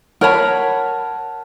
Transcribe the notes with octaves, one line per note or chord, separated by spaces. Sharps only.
A#4 C#5 F#5 A5 B5